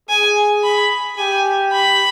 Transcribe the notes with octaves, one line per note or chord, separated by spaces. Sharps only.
G#4 G#5
B5
G4 G#5
B5